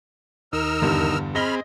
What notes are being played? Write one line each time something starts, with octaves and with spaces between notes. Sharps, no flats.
D#2 D#4 A#4 E6 F6
E2 G2 D3
C4 G#4 D#5 B5 F6 A#6 G7